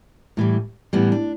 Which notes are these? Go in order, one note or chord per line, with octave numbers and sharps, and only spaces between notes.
A2 E3 G3
A2 E3 G3 B3
D4